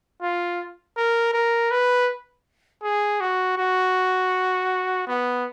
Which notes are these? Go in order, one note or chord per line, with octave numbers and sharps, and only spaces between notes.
F4
A#4
A#4
B4
G#4
F#4
F#4
B3